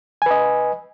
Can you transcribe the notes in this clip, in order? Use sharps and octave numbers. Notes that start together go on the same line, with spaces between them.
B4 D#5 G#5